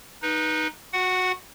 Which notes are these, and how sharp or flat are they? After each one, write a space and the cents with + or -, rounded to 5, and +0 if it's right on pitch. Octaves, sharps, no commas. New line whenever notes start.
D#4 +0 B4 -25
F#4 -15 F#5 +5